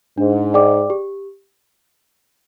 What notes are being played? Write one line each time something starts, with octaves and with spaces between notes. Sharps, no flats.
G#2 D4
G#4 D5 G5 D6
G4